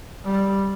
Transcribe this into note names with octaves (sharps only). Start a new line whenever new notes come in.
G3